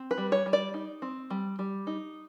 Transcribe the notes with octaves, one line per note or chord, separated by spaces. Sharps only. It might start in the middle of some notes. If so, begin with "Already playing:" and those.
Already playing: C4
B4
G3
C#5
G3
D5
D#4
C4
G3
G3
D#4